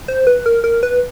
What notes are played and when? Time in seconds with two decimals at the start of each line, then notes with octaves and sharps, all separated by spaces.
0.08 C5
0.27 B4
0.46 A#4
0.64 A#4
0.83 B4